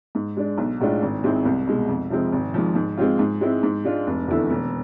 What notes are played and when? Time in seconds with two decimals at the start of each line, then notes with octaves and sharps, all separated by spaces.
0.15 G#2
0.37 G#3 D4
0.58 B1
0.81 A2 G#3 D4 F4
1.02 G#1
1.24 G#2 G#3 C4 E4
1.45 C2
1.67 B2 G#3
1.88 F2
2.10 C3 F3 G#3 C4
2.32 G#1
2.54 G#2 F3
2.75 G#2
2.97 G#3 C4 F4
3.19 G#2
3.41 G#3 C4 E4
3.63 G#2
3.85 G#3 D4 F4
4.07 F1
4.28 E2 D3 A3 E4
4.50 E1